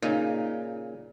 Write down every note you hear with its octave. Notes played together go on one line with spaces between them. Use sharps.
A#2 C#3 D#4